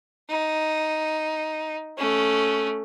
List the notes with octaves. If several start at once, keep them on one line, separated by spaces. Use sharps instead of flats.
D#4
A3 C#4